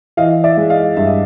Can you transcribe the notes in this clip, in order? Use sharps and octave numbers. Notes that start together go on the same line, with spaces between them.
E3 D#5 F5
D5 E5
G#3
D#5 F5
G2 E5
D#5